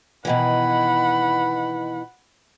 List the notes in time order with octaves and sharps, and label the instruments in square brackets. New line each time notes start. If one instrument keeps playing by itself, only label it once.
[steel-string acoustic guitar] B2 D#3 E3 [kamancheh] F#5 B5